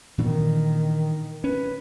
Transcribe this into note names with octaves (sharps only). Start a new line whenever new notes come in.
A#2 D#3 E3 D4
C#4 B4